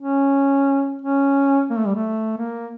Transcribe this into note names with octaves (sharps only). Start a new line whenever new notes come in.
C#4
C#4
A#3
A3
G3
A3
A#3